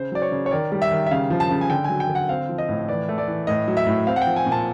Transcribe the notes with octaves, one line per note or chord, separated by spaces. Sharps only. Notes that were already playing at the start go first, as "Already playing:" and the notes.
Already playing: C#3 C5
F#3 D5
C#5
C#3
C#5
D#3 D5
G3
E5
D#3
E5
C#3 F5
F3
A5
C#3
G#5
D3 G5
G#5
F#3
G5
D3
F#5
C4 F5
F3
D#5
A2
E3 D5
A3
D5
E3
A2 D#5
F#3
E5
A2
C4 F5
F#5
G5
F3
G#5
A#2
A5